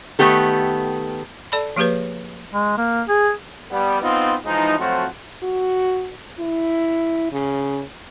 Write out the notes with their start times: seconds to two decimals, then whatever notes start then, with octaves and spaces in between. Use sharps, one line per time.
0.19 D#3 A3 B3 G4 A4
1.52 A4 D5 A5 B5
1.76 F3 A#3 G4 G#4 B4 C#5
2.54 G#3
2.78 A#3
3.09 G#4
3.71 G3 B3
4.01 B3 C4 D#4 F4
4.45 E3 F3 G#3 D#4
4.79 F3 F#3 A3 C4 F4 F#4
5.43 F#4
6.39 E4
7.32 C#3